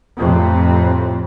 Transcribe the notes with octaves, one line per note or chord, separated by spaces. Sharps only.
F2 A2 C3